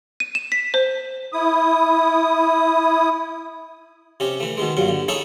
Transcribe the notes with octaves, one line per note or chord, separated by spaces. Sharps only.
D#7
E7
B6
C5
E4 D#6
C3 C#4 G4
E3 A3
B2 D#3 G#3
G2 A#2 F#3
D3
D#4 E4 G#4 A4 C#5